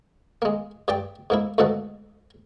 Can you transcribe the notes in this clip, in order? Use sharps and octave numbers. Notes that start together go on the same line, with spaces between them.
G#3 A#3
G2 G4 D5 G5 D6
G#2 A#3 E4
D2 G#2 B2 A#3 A4 F#5